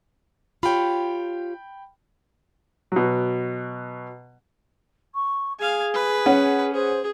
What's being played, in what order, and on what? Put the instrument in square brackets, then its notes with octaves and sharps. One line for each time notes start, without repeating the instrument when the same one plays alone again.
[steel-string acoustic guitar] F4 G4 C#5 [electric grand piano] G5 B5
[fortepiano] B2 F#3
[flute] C#6
[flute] G#4 [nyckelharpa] F5 G#5
[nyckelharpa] B4
[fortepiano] C#4 F#5
[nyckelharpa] G#4 [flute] C5